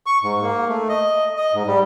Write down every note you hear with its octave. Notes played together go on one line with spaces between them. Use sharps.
C#6
G#2
A#3
A3
D#5
D#5
G#2
G3